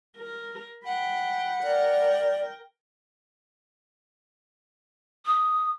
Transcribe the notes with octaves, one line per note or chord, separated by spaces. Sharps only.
A#4
F#5 G5 B5
A#4 D5 G5
D#6